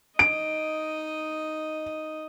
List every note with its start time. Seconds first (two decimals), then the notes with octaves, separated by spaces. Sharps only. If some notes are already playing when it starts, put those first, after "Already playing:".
0.19 D#4 D#5 D7